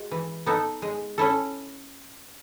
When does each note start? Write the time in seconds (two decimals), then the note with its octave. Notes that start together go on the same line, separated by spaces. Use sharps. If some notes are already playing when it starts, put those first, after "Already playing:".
Already playing: G#3 F#4
0.11 E3
0.46 B3 D#4 A4
0.82 G#3
1.18 C#4 E4 A4